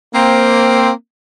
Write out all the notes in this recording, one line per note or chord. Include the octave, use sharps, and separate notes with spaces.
A#3 C4